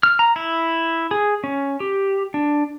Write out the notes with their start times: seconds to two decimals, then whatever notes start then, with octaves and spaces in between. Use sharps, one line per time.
0.03 F6
0.19 A#5
0.36 E4
1.11 G#4
1.44 C#4
1.80 G4
2.34 D4